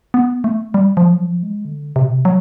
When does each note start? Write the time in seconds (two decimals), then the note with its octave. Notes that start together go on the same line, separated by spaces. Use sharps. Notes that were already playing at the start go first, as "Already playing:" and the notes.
0.14 B3
0.44 A3
0.74 G3
0.97 F3
1.13 F#3
1.20 F3
1.43 G#3
1.65 D3
1.96 C3
2.03 B2
2.10 C3
2.25 F#3